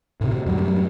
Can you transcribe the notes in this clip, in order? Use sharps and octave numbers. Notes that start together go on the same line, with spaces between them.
A2 C3
F#2 A2 F#3 G3